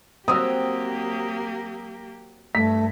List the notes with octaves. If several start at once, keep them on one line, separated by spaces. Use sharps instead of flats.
F#3 A#3 C4 G4 D#6 E6
G2 A3 B6